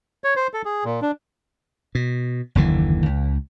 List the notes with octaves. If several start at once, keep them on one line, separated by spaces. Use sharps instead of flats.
C#5
C5
A4
G#4
A#2
D4
B2
F#1 D#2 D3 E3
C#2